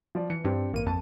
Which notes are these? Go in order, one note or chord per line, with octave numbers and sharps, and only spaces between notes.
F3 D5
E3 C#7
G2 C4 D4 G4
A1 A#3 D#7
F2 A5